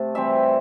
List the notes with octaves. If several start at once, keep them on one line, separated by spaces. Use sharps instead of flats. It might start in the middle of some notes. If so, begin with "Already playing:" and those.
Already playing: C3 A3 A5
E3 G3 C4 E5